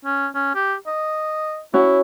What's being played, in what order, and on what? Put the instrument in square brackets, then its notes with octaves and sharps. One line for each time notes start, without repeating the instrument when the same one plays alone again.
[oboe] C#4
C#4
G4
D#5
[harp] C#4 F#4 C#5 [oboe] E4